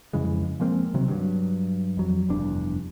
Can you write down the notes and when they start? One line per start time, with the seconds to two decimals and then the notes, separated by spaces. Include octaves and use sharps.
0.13 F2 C#3 E3 G#3
0.60 F3 G#3 A#3 C4
0.94 C3 D#3 F#3 C4
1.08 G2 F#3
1.97 F2 F#3
2.29 F1 E2 G2 D4